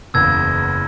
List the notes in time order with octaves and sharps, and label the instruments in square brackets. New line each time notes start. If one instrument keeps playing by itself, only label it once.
[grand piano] F#1 E2 C#3 [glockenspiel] E6 G#6